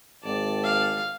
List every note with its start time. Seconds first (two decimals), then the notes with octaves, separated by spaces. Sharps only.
0.23 G#1 D5 A5
0.63 F5